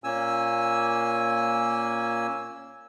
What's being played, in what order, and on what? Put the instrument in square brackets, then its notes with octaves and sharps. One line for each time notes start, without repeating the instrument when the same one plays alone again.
[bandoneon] A#2 A#3 C#4 G#5 E6